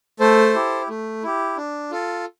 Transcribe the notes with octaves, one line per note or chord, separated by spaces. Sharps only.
A3 A4 C5
E4 G4
A3
E4 G4
D4
F4 A4